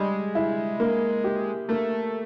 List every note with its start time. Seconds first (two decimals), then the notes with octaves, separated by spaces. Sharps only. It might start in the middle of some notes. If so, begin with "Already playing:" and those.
Already playing: G3 G#3
0.35 E4
0.80 A#3
1.24 G4
1.69 A3 A#3